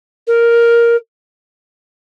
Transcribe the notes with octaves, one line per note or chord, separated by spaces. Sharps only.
A#4